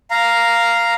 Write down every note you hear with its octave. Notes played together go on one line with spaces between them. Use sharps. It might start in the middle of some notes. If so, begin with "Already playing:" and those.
F5 A#5